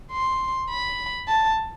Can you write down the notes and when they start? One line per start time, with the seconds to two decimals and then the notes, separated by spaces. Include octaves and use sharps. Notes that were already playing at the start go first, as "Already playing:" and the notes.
0.12 C6
0.70 B5
1.28 A5